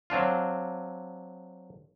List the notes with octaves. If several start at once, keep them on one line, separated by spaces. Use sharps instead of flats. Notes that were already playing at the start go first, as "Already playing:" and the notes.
F#3 C4 D4 F4